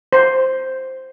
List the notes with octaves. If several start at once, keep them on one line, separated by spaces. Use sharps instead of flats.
C5